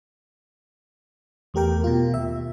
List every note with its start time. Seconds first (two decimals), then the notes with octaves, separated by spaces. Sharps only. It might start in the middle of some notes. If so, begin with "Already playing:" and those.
1.54 E2 A3 G4 A#4 G5
1.84 B2 F4
2.14 D#2 E5